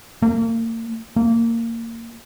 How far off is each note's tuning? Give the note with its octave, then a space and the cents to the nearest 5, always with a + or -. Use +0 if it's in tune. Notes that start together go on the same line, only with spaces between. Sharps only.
A#3 -40
A#3 -20